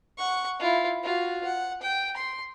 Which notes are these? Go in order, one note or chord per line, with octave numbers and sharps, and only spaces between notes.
F#5 C#6
E4 F4
F4 F#4
F#5
G5
C6